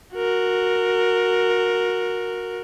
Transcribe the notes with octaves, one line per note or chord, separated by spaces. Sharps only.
F#4 A#4